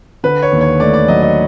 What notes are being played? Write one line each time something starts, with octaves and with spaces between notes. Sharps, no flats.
D3 B4
C#5
D#2
C#5
A3 D5
D5
F#3 D#5
D#5